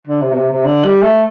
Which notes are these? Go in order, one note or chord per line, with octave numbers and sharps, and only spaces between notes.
D3
C3
B2
C3
C3
D3
G3
A3